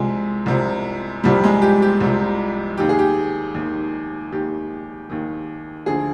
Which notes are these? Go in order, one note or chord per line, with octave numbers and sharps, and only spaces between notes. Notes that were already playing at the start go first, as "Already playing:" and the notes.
Already playing: C2 C3 F3 G#3
C2 C3 F3
C2 C3 F3 G3
G#3
G4
G4
C2 C3 F3
D#2 D#3 G4
G#4
G4
D#2
D#3
D#2 D#3 G4
D#2 D#3
D2 D3 F3 G#4